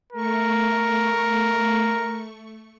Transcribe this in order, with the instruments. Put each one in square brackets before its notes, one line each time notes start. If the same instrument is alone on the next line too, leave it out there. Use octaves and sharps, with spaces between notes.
[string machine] A3 C#6 [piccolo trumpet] A#4